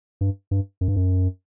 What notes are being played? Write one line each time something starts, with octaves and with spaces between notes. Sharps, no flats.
G2
G2
F#2
G2
F#2